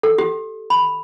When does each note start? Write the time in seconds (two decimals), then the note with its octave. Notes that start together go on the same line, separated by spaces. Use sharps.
0.03 A4
0.18 G4
0.70 B5